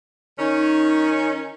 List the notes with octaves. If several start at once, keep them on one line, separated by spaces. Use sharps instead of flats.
D#3 C#4 D#4